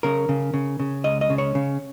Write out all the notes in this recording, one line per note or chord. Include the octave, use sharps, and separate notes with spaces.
C#3 A#4
C#3
C#3
C#3
C#2 D#5
D#5
C#3
C#5
C#3